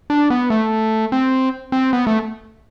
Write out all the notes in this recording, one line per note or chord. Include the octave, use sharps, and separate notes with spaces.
D4
B3
A3
C4
C4
B3
A3